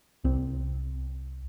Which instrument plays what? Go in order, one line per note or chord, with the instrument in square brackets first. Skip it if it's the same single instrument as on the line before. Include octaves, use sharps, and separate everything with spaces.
[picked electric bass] C2 C4